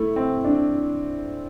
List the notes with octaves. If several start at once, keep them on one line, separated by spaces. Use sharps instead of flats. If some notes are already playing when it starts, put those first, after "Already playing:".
Already playing: A3 E4
C4
D4